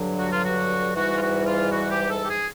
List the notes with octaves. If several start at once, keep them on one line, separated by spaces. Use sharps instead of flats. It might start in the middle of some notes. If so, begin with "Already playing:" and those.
Already playing: G2 D3 F#3
F#4
F4
F#4
G#2 E3 G3 F#4
F4
F#4
F4
F#4
G4
A4
G4
G#4